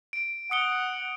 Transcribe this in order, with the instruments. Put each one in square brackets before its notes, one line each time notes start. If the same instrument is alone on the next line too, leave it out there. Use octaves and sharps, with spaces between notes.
[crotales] D7
[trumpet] F#5 [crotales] D#6 C#7 G7